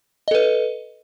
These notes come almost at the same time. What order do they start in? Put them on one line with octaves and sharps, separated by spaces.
D#5 A4 B4